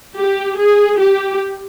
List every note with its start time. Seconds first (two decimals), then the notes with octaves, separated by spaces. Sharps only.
0.17 G4
0.58 G#4
1.00 G4